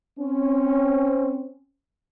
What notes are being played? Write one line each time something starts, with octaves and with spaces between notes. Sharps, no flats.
C4 C#4